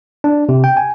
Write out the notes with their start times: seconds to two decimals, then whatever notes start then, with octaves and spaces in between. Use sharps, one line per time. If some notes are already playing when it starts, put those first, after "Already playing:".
0.24 D4
0.49 C3
0.64 G5
0.77 G#5